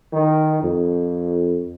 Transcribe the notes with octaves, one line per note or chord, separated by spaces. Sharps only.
D#3
F2